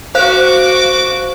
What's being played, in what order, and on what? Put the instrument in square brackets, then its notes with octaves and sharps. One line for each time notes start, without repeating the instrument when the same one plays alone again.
[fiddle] F#4 D6 [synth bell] C5 F5 F#6